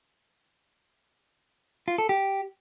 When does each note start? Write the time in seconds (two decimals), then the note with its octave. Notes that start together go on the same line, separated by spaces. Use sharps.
1.88 F4
1.98 A4
2.09 G4